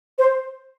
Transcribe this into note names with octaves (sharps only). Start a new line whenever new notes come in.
C5